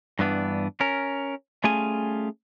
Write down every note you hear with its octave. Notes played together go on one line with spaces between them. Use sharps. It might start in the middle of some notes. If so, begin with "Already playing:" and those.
G2 E3 B3 D4
C#4 A#4
G3 A3 C#4 F4 G#4 G#5